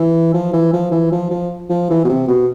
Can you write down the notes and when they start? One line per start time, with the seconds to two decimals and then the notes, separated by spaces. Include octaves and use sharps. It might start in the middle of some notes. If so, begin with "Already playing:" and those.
Already playing: E3
0.34 F3
0.53 E3
0.73 F3
0.91 E3
1.12 F3
1.31 F3
1.70 F3
1.89 E3
2.04 B2
2.09 C3
2.28 B2